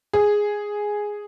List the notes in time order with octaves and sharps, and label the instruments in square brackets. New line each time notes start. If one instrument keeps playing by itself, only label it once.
[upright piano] G#4